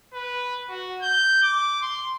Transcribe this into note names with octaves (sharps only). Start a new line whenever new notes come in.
B4
F#4
G6
D6
C6